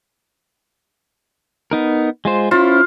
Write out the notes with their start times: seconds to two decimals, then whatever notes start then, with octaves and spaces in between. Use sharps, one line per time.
1.71 B3 D#4 A#4
2.25 G#3 F4 C5
2.51 C#4 E4 F4 C5